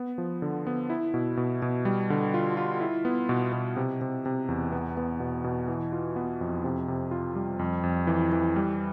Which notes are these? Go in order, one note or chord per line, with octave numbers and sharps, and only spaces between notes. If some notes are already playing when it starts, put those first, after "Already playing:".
Already playing: B3
F3
D3
B3
E4
B2
B2
B2
G3
D3
F4
F4
E4
B3
B2
B2
C3
C3
C3
E2
B3
B3
B2
B2
E3
F4
B3
F2
C3
C3
F4
G3
F2
F2
E3
E3
G3